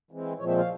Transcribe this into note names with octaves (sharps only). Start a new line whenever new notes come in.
E3 G#3 C4
A#2 F3 G#3 C4 C#5
E5
F5